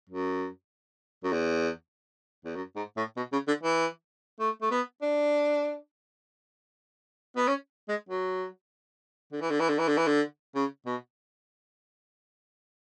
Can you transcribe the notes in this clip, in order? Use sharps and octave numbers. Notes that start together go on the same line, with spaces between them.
F#2
F#2
E2
E2
F#2
G#2
A2
B2
C#3
D3
E3
A3
A3
B3
D4
B3
C#4
G#3
F#3
D3
E3
D3
E3
D3
E3
D3
E3
D3
C#3
B2